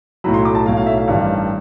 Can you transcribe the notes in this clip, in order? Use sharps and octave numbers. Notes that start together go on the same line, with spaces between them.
B1 A2 F#3 B5
C6
D6
A5
B1 A2 F#3 F5
F5
E5
F5
A1 G2 D#3 G3